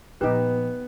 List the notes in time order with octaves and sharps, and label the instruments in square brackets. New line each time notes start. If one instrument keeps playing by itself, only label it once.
[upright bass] A#2 F3 [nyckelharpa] B3 [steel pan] D#4 G4 [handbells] B4